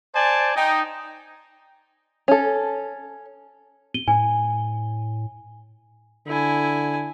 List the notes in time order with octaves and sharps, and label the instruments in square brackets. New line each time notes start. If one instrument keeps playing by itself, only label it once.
[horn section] C5 D5 G#5 A5
D#4 G5
[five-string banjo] C#4 A4
[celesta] D#7 G7
[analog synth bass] A2 [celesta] G#5
[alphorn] D3 [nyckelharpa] E4 G#5